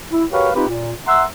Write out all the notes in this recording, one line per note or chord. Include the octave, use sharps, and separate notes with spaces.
E4
F#4 G4 A#4 B4 C#5 F5
C4 D#4 F4 G4 B4
A#2
E5 F#5 A#5 C6 E6